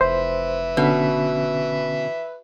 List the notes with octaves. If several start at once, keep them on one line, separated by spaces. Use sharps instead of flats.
F1 B4 C5 E5
B2 D3 B3 C#4